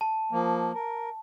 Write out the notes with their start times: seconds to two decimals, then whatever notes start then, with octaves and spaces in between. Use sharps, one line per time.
0.01 A5
0.32 F3 A#3
0.75 A#4